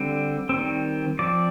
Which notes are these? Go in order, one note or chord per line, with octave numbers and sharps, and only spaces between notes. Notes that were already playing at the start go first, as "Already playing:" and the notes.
Already playing: D3 G3 C4
D#3 G3 C4
F3 C4 D5